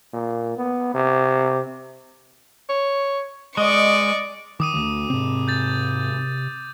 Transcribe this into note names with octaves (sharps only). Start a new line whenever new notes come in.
A#2
B3
C3
C#5
G#3 D5 D#5 C#6
D#3 D6 D#6 D#7
D2
G#2 C3 C4
G6 A6